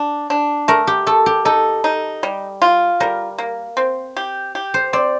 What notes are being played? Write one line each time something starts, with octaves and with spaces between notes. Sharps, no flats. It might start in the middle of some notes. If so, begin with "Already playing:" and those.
Already playing: D4
D4
A3 A#4
G4
A3 A4
G4
D#4 A4
D#4
G3
F4
G3 A#4
A#3
C4
G4
G4
C5
C4 D5